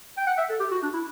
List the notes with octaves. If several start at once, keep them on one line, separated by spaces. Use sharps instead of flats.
G5
F#5
E5
A4
G4
F#4
D4
E4